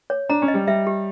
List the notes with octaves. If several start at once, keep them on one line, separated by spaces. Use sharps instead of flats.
C#5
D4 A#5
C#4
D#5
G3
G3 E5
G4